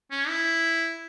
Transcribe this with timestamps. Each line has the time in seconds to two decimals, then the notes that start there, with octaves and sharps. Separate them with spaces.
0.11 C#4
0.28 E4